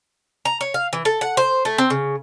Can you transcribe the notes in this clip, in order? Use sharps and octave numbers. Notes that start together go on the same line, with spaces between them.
A#5
C#5
F5
E3
A4
F#5
C5
A3
C4
C#3